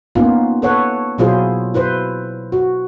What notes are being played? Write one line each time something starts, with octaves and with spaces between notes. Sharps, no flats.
A#3 B3 C#4 D#4 F4
A4 B4 C#5 F#5
B2 F#3 E4 F4 G#4 C5
E4 B4 C5
F#4